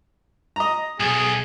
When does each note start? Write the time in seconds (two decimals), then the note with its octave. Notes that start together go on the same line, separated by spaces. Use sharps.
0.56 D#5 A#5
1.00 B1 G#4